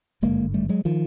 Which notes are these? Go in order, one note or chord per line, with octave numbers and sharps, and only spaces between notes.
G#1 G2 D3 G#3 A#3
G3 A3
F#3 G#3
D#3 F3